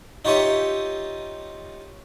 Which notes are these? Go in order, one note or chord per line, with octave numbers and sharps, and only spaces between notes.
D#4 F4 G4 C#5 D#5 E5